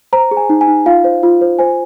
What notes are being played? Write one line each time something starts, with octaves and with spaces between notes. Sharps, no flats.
C5 A#5
G#4
G#5
D#4
G#5
D#4
F4 F5
C5
F4
C5
C5 G#5